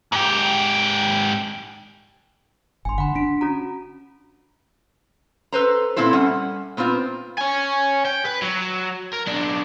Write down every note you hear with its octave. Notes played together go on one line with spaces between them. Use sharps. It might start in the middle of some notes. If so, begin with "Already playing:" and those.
G#2 G4
G1 G#5 C6
D3 F#5 B5
D4 B6 D7
C#4 F#4 A#5
A4 B4 C5 A#5
A#2 C4 E4 A4 C5
G3 C#4 F#5
A#2 B3 C4 F4
C#5 G#5
G5
B4
F#3
A#4
B1 D4